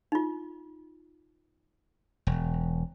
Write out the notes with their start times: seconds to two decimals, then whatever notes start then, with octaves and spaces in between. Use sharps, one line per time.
0.12 D#4 F4
2.27 E1